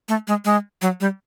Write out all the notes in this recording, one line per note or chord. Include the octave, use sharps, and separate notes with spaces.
A3
G#3
G#3
F#3
G3